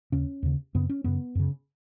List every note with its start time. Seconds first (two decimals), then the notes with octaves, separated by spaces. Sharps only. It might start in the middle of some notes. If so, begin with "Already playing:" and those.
0.12 D#2 C#3 C#4
0.43 D#2 C#3
0.75 F#2 C#3 B3
0.89 C#4
1.04 F#2 C#3 B3
1.35 F#2 C#3